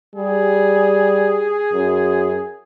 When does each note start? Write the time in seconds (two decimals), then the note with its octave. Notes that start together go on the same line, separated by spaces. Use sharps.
0.15 G3 G#4
1.73 F#2